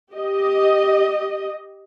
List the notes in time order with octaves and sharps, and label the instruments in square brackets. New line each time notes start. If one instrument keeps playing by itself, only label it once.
[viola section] G4 D#5